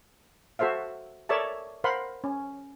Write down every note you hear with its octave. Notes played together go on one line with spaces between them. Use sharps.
F#4 A4 C5 E5 F5
A4 A#4 C#5 D5 E5 A5
A#4 C5 F5 F#5 B5 C6
C#4